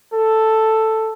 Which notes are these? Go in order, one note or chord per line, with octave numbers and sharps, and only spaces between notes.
A4